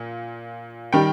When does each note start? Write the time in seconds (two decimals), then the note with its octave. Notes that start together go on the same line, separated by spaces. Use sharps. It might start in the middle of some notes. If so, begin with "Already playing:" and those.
Already playing: A#2
0.93 D#3 G3 G5